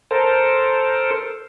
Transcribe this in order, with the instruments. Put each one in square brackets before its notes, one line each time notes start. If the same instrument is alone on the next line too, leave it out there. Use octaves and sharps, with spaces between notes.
[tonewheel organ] A4 A#4 C5